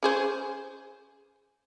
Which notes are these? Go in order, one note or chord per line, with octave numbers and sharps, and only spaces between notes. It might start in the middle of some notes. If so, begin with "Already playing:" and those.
C#4 G#4 C5